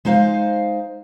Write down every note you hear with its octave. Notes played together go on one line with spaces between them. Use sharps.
G#3 D#4 C5 F5